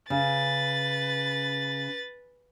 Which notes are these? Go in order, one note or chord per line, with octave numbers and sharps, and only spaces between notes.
C#3 B4 A6